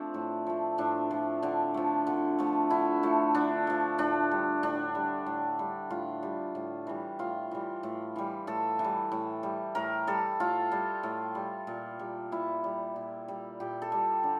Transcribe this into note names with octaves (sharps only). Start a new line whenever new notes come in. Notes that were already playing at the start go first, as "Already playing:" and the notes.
Already playing: F3 A3 C4 D4
A2
F3 A3
A2 D4
F3 A3
D3 D4
F3 A3
D3
F3 A3
D3 E4
F3 A3
D3 D4
F3 A3
A2 D4
G3
A2 D4
G3
A2
G3
A2 F4
G3
A2
E3 G3
A2 F4
E3 G3
A2
E3 G3
A2 A4
E3
G3
A2
G3
A2 A#4
G3 A4
A2 F4
G3
A2
G3
A#2
G3
A#2 E4
G3
A#2
G3
A#2 G4
A4
G3
D3